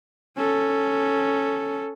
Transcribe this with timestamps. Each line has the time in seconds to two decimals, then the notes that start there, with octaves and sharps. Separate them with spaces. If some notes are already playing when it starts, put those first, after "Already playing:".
0.36 C#4 A4